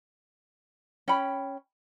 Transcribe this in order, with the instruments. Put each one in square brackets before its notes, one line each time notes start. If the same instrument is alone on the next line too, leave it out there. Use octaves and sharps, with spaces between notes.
[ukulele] C#4 G5 B5